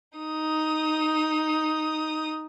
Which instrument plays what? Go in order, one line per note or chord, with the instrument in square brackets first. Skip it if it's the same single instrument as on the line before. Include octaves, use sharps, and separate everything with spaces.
[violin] D#4 D#6